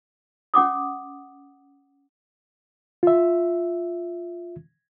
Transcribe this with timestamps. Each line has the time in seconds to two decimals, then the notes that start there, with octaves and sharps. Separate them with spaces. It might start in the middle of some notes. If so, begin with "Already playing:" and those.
0.54 C#4 F#5 D6 D#6
3.03 F4 E5